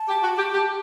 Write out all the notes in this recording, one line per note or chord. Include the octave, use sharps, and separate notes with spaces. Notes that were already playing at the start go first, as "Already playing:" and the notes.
Already playing: A5
G4
F#4
G4
G4